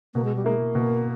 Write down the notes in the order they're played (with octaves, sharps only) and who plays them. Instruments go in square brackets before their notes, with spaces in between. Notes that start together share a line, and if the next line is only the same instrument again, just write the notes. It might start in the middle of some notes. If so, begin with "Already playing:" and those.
[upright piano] B2 [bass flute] A#3
[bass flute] G#3
G3
[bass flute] G#3 [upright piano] A#3 E4
[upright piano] B2 [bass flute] A#3